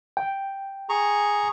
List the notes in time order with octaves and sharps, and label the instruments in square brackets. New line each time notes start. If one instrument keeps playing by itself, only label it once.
[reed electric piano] G5
[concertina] G#4 A#5 C#6